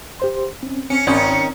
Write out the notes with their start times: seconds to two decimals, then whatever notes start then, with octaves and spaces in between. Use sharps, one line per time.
0.20 G4 C5 C6
0.63 C4 C#4
0.90 C4 C#4 C#7
1.07 G#1 D#3 C#4